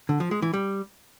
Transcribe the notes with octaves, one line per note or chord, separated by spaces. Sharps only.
D3
F3
G#3
E3
G3